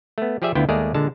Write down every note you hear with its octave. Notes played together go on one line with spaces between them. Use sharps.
A3 B3
F3 G4 G#4 D5 E5
D2 D3 B3 E4 F4 G5
D#2 G#3 A3 G#4 A#4 D5
A#2 D3 G#3 A5